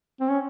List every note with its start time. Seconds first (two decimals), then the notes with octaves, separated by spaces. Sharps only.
0.20 C4
0.29 C#4